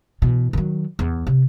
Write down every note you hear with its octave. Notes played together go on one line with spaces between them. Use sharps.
B2 E3
D#3 F#3
E2
C3